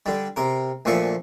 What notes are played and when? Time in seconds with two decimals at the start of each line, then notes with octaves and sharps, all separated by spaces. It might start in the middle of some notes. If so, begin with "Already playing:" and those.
0.06 D3 G3
0.36 C3 A#4
0.85 D2 A#2 F3 E5 C#6